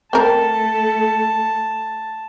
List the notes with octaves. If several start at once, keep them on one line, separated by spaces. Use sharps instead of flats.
A3 C4 A4 A#4 A5